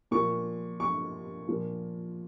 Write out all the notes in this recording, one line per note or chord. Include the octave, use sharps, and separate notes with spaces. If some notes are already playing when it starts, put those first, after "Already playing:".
A#2 F3 C#6
C#6
A#2 F3